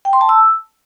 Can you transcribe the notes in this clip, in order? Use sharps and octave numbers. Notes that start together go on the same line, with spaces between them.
G5
C6
A5
E6